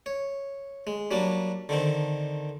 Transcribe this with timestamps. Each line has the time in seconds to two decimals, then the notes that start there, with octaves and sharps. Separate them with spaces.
0.06 C#5
0.87 G#3
1.11 F#3 G3 A#3 D4
1.69 D3 D#3 C4